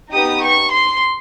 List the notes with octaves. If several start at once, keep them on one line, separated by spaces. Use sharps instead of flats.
B3 D#4 G4 D#6
C#6
C6